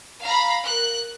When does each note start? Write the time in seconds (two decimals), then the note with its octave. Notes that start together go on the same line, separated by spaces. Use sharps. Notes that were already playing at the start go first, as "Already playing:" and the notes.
0.23 F5 A#5 B5
0.63 A#4 F#6